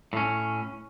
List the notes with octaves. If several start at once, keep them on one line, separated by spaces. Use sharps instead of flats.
A2 C#4